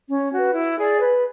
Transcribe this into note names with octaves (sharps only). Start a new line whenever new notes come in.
C#4
F#4 B4
E4
G#4 D5
B4